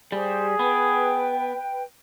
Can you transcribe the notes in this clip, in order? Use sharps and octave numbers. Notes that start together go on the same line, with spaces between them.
G3 G4 G#4 C5
B3 B4 G5